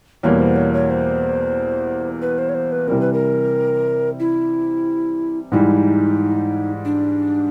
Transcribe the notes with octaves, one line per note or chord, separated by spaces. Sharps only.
E2 B2 G3 A#3 C#5
C5
C#5
C#5
C5
B4
C5
C#5
C5
B4
C3 E3 G3 C4 A#4
B4
A#4
E4
G#2 E3 G3 D#4
D4